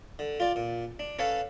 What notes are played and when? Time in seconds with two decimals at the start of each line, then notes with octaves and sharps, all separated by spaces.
0.19 D3
0.40 F4 D5
0.56 A#2
0.99 D4
1.19 C#4 A4 B4 C#5 F5 A5